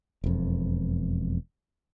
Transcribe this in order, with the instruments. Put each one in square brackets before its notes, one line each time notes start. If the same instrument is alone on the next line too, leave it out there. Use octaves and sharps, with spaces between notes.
[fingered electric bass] E1 F2